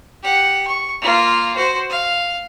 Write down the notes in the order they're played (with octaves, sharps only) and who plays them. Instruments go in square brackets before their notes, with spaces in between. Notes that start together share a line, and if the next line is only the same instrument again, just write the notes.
[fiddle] G4 F#5
C#6
A#3 F4
F#4 C5
F5